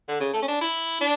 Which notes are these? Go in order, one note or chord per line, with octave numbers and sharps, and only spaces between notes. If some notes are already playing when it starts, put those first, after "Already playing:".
D3
C#3
A3
C#4
D4
E4
D4